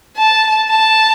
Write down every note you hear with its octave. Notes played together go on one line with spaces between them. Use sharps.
A5
A5